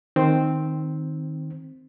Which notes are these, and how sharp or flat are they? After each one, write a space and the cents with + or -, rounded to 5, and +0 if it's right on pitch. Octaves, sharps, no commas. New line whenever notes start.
D#3 +0 C4 +0